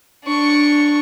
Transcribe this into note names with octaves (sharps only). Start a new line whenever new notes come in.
D4 C#6